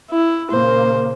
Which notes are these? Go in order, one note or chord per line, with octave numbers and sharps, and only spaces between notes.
E4
A#2 C#3 A#3 C5